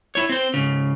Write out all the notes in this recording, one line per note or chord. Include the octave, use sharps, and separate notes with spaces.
E4 C#5
C4 C5
G#2 C#3